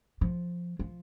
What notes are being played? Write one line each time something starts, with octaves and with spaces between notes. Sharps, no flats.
F3
F3